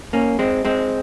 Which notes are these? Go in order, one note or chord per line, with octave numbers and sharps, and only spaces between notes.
A#3 C#4
G#3 C4
G#3 C4